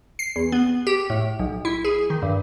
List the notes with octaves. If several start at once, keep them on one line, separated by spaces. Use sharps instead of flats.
C7
E2
B3
G4
A2
B1
E4
G#4
D#3
G2